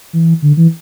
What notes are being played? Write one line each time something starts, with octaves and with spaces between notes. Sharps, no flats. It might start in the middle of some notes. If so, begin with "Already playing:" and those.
E3
D3
E3